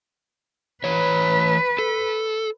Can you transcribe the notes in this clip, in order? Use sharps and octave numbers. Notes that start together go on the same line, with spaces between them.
E3 B4 C#5
A4